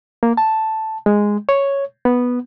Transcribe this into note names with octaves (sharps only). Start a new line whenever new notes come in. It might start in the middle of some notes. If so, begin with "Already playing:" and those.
A#3
A5
G#3
C#5
B3